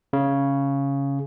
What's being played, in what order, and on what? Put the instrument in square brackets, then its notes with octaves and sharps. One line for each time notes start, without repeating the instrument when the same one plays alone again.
[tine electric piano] C#3